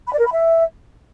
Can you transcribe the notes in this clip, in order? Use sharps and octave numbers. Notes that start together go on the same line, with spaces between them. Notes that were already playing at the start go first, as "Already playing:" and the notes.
B5
D5
A#4
B5
E5